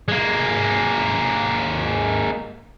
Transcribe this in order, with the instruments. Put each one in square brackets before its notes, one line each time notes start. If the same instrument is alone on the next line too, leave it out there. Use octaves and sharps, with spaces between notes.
[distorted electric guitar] G#3 A#3